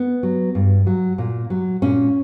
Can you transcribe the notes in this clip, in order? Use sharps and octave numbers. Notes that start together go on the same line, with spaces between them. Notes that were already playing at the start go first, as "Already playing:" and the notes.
Already playing: B3
F#3
G2
F#3
A#2
F#3
A#2 C#4